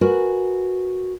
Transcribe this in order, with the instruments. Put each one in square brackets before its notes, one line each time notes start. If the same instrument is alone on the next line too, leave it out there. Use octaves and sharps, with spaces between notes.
[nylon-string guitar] F#4 A#4 B4 G#5